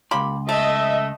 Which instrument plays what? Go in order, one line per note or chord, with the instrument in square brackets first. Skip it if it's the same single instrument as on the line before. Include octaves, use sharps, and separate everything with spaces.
[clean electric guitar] C#2 C6 [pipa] A#3 G4 B5
[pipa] A3 [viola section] D#5 E5